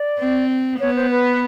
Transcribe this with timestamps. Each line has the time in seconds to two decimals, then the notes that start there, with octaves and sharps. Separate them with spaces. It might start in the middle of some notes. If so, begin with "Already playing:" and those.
Already playing: D5
0.19 C4
0.79 B3 C#5
0.95 C5
1.10 B4